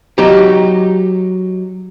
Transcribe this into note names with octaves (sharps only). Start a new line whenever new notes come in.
F#3 D#4 G4